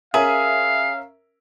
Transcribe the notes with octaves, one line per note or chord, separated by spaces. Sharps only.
C#4 G#4 A#4 E5 F5